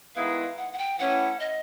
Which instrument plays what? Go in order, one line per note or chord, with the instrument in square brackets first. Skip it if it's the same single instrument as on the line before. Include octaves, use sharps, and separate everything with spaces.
[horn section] D#3 G#3 B3 E4 [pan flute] F5
[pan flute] F#5
F#5
G5
[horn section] E3 A3 C#4 E4 [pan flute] F#5
[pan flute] D#5